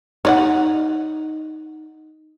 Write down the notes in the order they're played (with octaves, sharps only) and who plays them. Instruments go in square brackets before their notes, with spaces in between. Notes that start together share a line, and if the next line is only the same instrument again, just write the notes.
[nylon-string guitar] D#4 [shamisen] C#5 D5 F#5